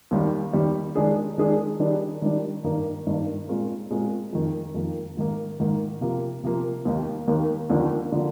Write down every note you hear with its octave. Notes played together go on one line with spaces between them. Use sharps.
D#2 D#3 G3
D#2 D#3 G3
D#3 G#3 D4 G#4
D#3 G#3 D4 G#4
D#3 G3 D4
D#3 G3 D4
G2 D#3 A#3 D#4 A#4
G2 D#3 A#3 D#4 A#4
A#2 G#3 C4 F4 A#4
A#2 G#3 C4 F4 A#4
F2 D#3 A#3
F2 D#3 A#3
G#2 D#3 A#3
G#2 D#3 A#3
C3 F3 A#3
C3 F3 A#3
D#2 D#3 A#3
D#2 D#3 A#3
D#2 D3 F3 A#3
D3 F3 A#3